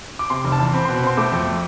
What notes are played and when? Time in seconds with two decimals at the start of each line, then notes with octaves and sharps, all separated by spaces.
0.19 D6
0.30 C3 C6
0.44 F1
0.52 A5
0.59 E2
0.73 C4 B5
0.85 C6
0.89 B2
0.96 B5
1.03 C4 C6
1.17 A3 D6
1.32 F2